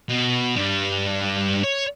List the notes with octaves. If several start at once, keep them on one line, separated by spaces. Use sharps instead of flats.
B2
G2 G3
C#5